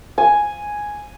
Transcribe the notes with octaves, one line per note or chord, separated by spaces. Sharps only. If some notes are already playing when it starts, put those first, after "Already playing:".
G#5